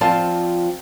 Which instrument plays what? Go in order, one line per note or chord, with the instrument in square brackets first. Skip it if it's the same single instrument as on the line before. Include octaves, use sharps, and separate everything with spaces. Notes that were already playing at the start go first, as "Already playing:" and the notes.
[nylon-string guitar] F3 C4 F4 D5 F5 A5